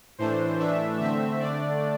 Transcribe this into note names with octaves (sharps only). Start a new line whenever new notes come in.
A2 E3 A3 D4 C5
A2 E3 A3 D4 E5
D3 A3 C4 E5
D3 A3 D4 D5